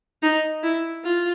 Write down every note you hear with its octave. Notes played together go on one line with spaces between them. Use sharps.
D#4
E4
F4